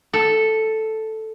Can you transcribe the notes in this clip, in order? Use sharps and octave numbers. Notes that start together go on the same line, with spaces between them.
A4